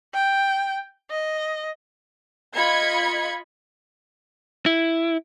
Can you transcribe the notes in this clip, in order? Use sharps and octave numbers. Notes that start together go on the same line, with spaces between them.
G5
D#5
F4 D#5 B5 G#6 C#7
E4